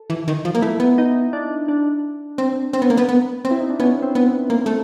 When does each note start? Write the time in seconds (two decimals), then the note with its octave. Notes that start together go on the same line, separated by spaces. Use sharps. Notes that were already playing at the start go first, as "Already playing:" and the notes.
Already playing: A4
0.10 E3
0.28 D#3
0.45 F3
0.55 A#3
0.62 A3 E4
0.80 B3
0.98 D#4
1.33 D4
1.68 D4
2.38 C4
2.73 C4
2.82 B3
2.90 A#3
2.97 B3
3.09 B3
3.45 C4
3.51 E4
3.60 D#4
3.70 D4
3.80 B3 C#4
4.02 C4
4.15 B3
4.26 B3
4.50 A#3
4.66 A3